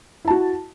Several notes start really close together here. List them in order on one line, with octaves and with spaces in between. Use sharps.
E4 A5 F#4